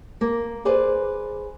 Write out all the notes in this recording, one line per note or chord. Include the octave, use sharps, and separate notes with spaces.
A#3
G#4 B4 C5 D5